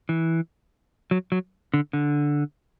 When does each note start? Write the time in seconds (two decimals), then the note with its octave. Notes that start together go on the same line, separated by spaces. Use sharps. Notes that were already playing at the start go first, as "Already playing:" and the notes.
0.09 E3
1.11 F#3
1.32 F#3
1.74 D3
1.93 D3